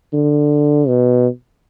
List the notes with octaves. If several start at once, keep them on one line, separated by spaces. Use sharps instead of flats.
D3
B2